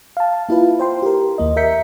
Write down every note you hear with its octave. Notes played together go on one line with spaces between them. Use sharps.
F5 A5
A#3 E4 F4 B4
C5 G5 C6
G4 A#4
D#2 A#3 D#5
A#4 E5 G6 B6 C#7